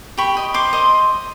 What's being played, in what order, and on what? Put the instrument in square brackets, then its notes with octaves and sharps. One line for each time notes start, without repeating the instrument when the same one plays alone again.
[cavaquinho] G4 B5 C#6
D#5
C5 C6 D6
D#5